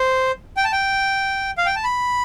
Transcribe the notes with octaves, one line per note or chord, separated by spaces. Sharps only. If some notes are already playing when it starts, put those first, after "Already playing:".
Already playing: C5
G5
A5
G5
F5
G5
A5
B5